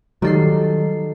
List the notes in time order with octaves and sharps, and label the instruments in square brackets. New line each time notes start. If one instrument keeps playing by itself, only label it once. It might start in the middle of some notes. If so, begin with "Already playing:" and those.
[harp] D#3 A4 C7 [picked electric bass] F#3 G3